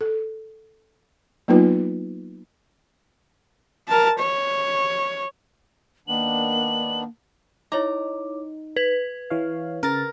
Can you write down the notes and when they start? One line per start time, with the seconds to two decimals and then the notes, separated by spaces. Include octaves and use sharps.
0.01 A4
1.48 F#3 A#3 B3 D#4 F4 B4
3.88 A#4 A5
4.19 C#5
6.08 D#3 A#3 B3 D4 F#7
7.72 D#4 E4 C#5 A#5 D6
8.76 B4 G#6
9.30 E3 C#5 F5
9.83 C#3 A#4 A6